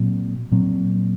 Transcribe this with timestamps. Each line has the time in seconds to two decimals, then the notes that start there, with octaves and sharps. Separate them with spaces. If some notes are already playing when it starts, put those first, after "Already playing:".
Already playing: A#2 F#3 C4
0.52 A#2 F#3 C4